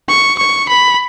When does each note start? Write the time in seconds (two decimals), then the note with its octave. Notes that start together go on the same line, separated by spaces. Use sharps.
0.09 C#6
0.38 C#6
0.69 B5